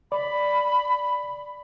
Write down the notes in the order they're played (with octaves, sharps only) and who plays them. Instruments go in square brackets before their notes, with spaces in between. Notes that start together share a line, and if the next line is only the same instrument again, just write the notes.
[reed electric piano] D5 [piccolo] B5